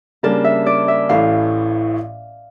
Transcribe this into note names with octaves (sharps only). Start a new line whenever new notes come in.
C#3 G3 A#3 D4 A5
E5
D5
E5
A1 A2 E3 A3 F5